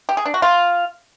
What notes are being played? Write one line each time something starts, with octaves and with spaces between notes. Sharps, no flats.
G4
G#4
D4
F#4
F4